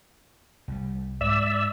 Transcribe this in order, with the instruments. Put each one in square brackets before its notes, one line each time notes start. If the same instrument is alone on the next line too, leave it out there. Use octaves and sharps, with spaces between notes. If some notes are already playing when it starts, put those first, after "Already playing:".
[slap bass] C2 G3
[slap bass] G#2 [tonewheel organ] D5 E5 E6